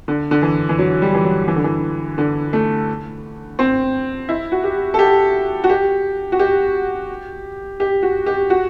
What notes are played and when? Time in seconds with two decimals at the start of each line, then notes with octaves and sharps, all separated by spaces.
0.08 D3
0.31 D3
0.42 E3
0.69 E3
0.79 F#3
1.02 G3
1.14 E3
1.24 F#3
1.48 E3
1.56 D3
1.64 E3
2.18 D3
2.53 A3
3.59 C4
4.29 E4
4.52 F#4
4.64 G4
4.94 A4
4.99 G4
5.64 F#4
5.69 G4
6.32 F#4
6.39 G4
7.80 G4
8.02 F#4
8.26 G4
8.50 F#4